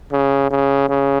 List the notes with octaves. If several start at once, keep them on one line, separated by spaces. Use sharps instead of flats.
C#3
C#3
C#3